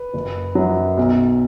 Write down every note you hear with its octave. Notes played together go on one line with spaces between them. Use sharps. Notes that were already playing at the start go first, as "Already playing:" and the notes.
Already playing: B4
F#1
F#2 F#3
B1